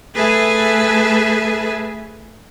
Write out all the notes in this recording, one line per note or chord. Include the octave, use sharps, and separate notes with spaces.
A3 G#4 A4 B4 E5 G#5